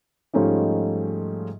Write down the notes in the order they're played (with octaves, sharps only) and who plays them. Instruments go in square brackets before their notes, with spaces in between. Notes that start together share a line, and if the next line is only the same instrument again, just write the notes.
[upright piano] G#2 F3 G3 A3 C#4 D#4